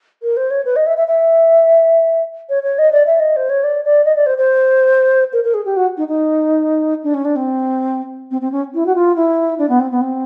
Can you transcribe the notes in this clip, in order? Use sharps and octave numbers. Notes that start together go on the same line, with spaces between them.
A#4
C5
C#5
B4
D#5
E5
E5
E5
C#5
C#5
D#5
D5
E5
D#5
C5
C#5
D5
D5
D#5
D5
C5
C5
A#4
A#4
G#4
G4
F#4
D#4
D#4
D4
C#4
D4
C4
C4
C4
C#4
E4
F#4
F4
E4
D4
B3
C4
B3
C4